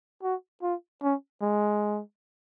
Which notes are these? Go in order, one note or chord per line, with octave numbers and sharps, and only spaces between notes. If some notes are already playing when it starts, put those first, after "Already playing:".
F#4
F4
C#4
G#3